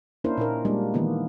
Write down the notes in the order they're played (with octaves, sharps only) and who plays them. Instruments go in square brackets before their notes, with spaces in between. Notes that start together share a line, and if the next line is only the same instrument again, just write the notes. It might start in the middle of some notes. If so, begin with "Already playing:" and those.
[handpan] A#3 C#4 D4 E4 A#4 C5
A#2 D#4 A#4
G3 G#3 A#3 D4
D#3 E3 A#3 B3